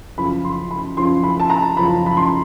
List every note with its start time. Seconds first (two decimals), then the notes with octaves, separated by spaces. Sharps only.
0.17 F#2 C#3 F3 B5
0.44 C6
0.71 B5
0.97 F#2 C#3 F3 C6
1.23 B5
1.40 A5
1.50 A#5
1.77 F#2 C#3 F3 B5
2.06 B5
2.17 C6